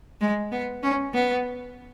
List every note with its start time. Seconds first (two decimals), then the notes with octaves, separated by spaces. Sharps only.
0.21 G#3
0.52 B3
0.83 C#4
1.14 B3